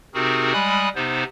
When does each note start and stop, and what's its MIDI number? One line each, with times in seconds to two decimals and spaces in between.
0.14 0.53 48
0.14 0.53 60
0.14 0.53 63
0.14 0.53 66
0.14 0.53 68
0.14 0.53 70
0.53 0.89 55
0.53 0.89 56
0.53 0.89 80
0.53 0.89 83
0.53 0.89 87
0.53 0.89 90
0.95 1.24 48
0.95 1.24 59
0.95 1.24 63
0.95 1.24 72